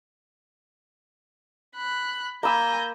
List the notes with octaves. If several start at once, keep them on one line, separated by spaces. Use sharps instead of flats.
B5 F#6
A#3 G#5 B5 E6 G6 A#6